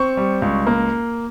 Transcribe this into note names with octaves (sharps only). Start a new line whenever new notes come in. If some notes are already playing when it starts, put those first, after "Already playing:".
Already playing: C4 C#6
G3
C#2
A#3